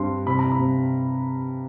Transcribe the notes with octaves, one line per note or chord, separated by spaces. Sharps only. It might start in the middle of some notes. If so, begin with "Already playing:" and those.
Already playing: G2 C4 C6
C3 B5
A#5
B5
C3